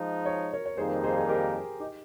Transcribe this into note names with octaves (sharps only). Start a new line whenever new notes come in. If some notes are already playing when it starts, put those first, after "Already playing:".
Already playing: F3 G#3 D#4
C#5
A#4 C#5
C#5
F2 D#3 G3 A#3 D#4 G#4 C5
G#4 C5
G#4
G4 A#4
D#4 G4